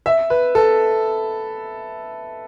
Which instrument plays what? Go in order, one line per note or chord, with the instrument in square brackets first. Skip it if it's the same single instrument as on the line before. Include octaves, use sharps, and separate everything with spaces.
[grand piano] E5
B4
A4